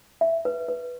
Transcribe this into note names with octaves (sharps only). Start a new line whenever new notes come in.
E5
B4
B4